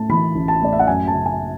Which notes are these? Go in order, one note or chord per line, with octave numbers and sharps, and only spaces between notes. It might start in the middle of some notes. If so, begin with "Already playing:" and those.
Already playing: A2 A3 A5
E3 B5
A1
A5
A2 D5
E5
F#5
F#2 G#5
A5
C#3
G#5